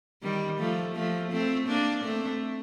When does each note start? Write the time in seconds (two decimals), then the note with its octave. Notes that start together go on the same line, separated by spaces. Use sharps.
0.23 D#3 G3
0.59 F3 A3
0.95 F3 A3
1.32 A3 C4
1.67 A#3 D4
2.04 A3 C4